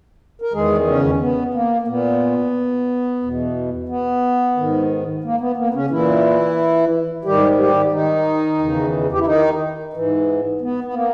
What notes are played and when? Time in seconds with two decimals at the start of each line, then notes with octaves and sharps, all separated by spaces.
0.42 A#4
0.53 E2 D#3 G#3 G#4
0.87 C#3 C#4
1.20 B3
1.54 A#3
1.82 A#3
1.88 A#2 B3
3.23 E2 B2
3.89 B3
4.57 G#2 D#3
5.24 A#3
5.40 B3
5.57 A#3
5.69 B3
5.74 C#3 C#4
5.90 A#2 E3 E4
7.25 G#2 D#3 G3 G4
7.58 G3 G4
7.92 D#3 D#4
8.59 E2 C#3 E3
9.12 G4
9.19 E4
9.26 D#3 D#4
9.93 G#2 E3
10.61 B3
10.84 B3
10.94 A#3